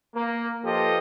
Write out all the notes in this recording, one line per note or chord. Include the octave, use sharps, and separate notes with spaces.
A#3
G2 F3 F4 G4 A4 D#5